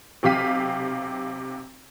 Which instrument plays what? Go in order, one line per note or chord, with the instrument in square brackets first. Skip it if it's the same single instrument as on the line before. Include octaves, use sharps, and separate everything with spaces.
[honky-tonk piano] B1 C3 G4 F5 B6 D#7